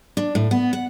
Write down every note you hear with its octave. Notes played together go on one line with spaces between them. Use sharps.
D4
A2
B3
F#5